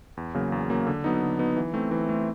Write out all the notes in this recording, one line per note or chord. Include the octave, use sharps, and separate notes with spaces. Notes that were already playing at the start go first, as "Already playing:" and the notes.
E2
C#3 F#3 A#3
E2
C#3 F#3 A#3
D3
F#3 B3 D#4
D3
F#3 B3 D#4
E3
A3 C4
E3
A3 C4